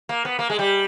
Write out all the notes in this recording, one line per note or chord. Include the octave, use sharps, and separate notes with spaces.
A#3
B3
A#3
G#3
G3